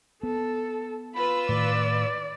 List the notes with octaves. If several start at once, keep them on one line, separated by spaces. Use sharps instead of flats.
B3 A4
F4 B4 B5 E6
A2 D#3 D5